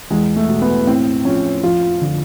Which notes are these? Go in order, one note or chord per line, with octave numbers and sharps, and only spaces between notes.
E2 G#3
A3
B2
B3
A2 C4
F3 C#4
F2 F4
D3 F3